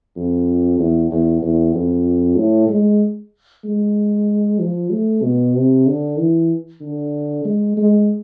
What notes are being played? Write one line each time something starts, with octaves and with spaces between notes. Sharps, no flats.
F2
E2
E2
E2
F2
A2
G#3
G#3
F3
A3
B2
C3
D3
E3
D3
G#3
G#3